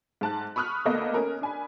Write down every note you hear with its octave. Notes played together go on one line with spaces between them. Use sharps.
G#2 A5 F#6
B5 C#6 D#6 F6 F#6
D2 A#3 B3 A4 D#5
C#4 A#4
D4 G#5 B5